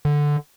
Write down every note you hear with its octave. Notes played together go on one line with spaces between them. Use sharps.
D3